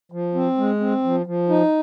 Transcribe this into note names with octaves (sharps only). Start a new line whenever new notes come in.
F3
C4
G#3
C4
F3
F3
D#4